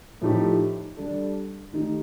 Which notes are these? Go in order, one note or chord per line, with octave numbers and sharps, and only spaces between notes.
A2 F3 A3 D#4 G4
G3 D4 A4
D#3 A3 D#4 G4